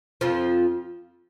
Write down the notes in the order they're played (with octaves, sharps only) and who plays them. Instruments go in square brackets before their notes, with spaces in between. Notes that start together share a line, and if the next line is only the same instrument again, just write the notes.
[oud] F2 F3